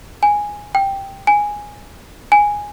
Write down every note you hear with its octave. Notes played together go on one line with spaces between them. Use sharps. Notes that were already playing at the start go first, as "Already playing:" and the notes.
G#5
G5
G#5
G#5